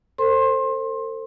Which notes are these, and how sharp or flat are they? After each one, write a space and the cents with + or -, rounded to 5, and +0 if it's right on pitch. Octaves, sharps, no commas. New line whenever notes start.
A4 +40 C5 +20 C6 +25